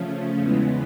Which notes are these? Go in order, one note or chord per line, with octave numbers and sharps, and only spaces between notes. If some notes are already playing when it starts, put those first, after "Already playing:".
Already playing: C#3 F3 A3 C#4
E2 C#3 E3 G#3 B3